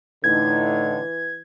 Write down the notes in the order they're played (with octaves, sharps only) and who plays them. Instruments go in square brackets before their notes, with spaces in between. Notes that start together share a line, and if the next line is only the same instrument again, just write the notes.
[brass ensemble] A2 D3 D#4 [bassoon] E3 [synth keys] G#6